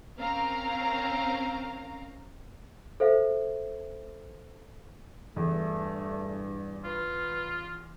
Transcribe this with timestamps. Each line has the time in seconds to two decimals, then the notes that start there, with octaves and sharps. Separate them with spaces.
0.19 C4 C#4 A#4 F5 A#5
3.00 A4 C5 E5 F5
5.36 E2 G2 A3
6.84 F4 B4